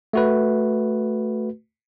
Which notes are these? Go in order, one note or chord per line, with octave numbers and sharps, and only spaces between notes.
A3 F#4 B4